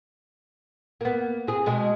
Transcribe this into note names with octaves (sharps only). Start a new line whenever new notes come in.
A#3 B3
C4 G#4
B2 G#3 G4